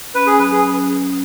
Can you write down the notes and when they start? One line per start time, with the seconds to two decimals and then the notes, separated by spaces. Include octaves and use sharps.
0.15 C#4 B4
0.27 G#4
0.39 F#3 B4
0.52 G#4
0.65 C#4